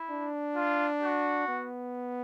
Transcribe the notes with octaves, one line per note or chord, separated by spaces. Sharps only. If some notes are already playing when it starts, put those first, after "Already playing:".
Already playing: E4
D4
F4
F#4
B3